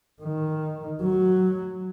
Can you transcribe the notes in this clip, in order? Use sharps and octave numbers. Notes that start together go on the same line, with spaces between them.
D#3
F#3